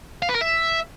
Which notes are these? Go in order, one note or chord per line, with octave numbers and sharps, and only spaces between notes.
F5
B4
A#4
E5